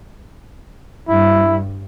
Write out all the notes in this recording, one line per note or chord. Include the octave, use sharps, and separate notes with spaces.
G2 E4